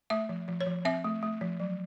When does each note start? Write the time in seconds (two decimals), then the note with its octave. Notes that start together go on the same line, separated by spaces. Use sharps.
0.10 A3 E5
0.29 F3
0.48 F3
0.61 C#5
0.67 F3
0.85 C4 E5
1.04 A3
1.23 A3
1.41 F3
1.60 F#3